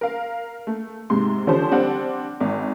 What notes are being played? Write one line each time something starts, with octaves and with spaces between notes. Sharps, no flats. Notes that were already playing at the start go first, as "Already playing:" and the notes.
A#4 F5
A3
G#2 C3 C6
D3 F3 C#4 G4 A4 C5
G3 C4 D4 F#5
G#1